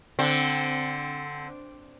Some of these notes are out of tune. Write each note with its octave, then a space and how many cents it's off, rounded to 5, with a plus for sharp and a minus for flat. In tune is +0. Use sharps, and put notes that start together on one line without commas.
D3 -5 C4 -5